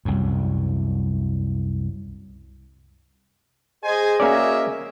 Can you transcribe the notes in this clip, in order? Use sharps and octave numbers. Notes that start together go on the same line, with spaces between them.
C2 F#2
G#4 C5 D#5 G#5
A#3 C#4 F#4 A#4 D5 E5